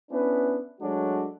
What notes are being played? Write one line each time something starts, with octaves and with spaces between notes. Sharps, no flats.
B3 C#4 D4 E4 B4
F#3 G#3 A3 D4 F#4